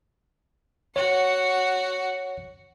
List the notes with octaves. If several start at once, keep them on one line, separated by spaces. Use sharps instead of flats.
F#4 C#5 F#5